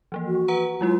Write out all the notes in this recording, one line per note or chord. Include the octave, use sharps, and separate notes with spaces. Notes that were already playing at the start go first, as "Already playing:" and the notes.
E3 F3 A#3
F#4
B4 F#5 A#5
F#3 G#3 E4 F4